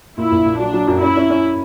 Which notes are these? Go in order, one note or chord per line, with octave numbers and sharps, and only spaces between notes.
A#2 E4
A#1
A#2
F#3 D4
F#3
F#2
C#4 E4
C#4
C#4